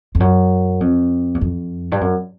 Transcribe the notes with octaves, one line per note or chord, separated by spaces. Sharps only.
F2
F#2
F2
E2
F2
G2
F#2